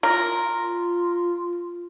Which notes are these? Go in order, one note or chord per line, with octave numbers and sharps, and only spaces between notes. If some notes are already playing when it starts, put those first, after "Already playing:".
F4 A#4